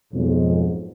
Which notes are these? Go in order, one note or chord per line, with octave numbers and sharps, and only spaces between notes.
B1 F2 G#2